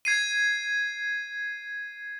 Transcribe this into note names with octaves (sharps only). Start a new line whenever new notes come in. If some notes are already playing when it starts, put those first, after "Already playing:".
G#6 C7 D#7